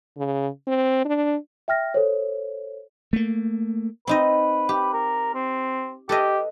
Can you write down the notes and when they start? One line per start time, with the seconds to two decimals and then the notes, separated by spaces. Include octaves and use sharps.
0.17 C#3
0.67 C4
1.05 D4
1.68 E5 G5 F6 A#6
1.94 A4 C5 C#5
3.13 A3 A#3
4.07 C4 D#4 B4 D#5
4.69 G4
4.94 A#4
5.34 C4
6.09 G4 A4 B4 D#5